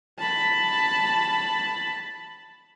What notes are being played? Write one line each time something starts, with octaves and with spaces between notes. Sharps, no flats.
A5 B5